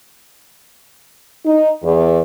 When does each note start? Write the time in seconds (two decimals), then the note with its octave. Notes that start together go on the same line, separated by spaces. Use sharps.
1.46 D#4
1.84 E2